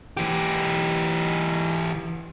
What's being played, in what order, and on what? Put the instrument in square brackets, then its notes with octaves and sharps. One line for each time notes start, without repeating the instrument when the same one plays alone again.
[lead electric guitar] E3 G4